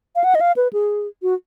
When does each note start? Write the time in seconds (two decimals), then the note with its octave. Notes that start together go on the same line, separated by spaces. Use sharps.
0.16 F5
0.24 F#5
0.35 D#5
0.41 F5
0.56 B4
0.73 G#4
1.22 F#4